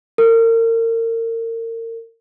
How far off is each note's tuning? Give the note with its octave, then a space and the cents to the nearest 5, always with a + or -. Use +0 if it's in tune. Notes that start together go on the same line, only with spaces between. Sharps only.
A#4 -35